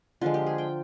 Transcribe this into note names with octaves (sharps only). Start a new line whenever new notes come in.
D3 F3 G#3 F4
G4
G#4
G5